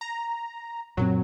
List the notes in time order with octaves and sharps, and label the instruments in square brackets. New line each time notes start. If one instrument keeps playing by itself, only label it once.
[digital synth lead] A#5
[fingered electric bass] F#2 A#2 C4 [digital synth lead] F#3